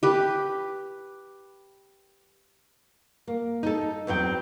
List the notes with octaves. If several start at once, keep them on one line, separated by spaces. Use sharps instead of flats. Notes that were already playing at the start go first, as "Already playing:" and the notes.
G4 B4
A#3
D#4 A4
E2 F#3 C4 G5